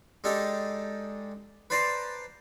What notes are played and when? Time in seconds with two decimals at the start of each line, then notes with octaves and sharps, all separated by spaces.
0.24 G#3 D4 D#4 G4 A4
1.70 B4 C5 D5 A5 A#5 C6